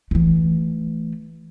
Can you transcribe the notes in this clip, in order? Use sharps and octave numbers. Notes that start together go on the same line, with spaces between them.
E3 A3